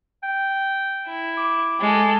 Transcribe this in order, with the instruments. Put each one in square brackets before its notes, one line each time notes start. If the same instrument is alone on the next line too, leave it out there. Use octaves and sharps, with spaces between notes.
[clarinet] G5
[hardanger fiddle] E4
[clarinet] D6
[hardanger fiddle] G#3 A4